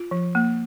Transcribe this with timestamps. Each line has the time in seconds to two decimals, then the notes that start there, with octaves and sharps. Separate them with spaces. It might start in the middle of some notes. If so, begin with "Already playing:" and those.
Already playing: F4
0.11 F3
0.35 A#3